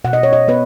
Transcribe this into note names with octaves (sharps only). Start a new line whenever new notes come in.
B2 F#5
D#5
C#5
D#5
B3 B4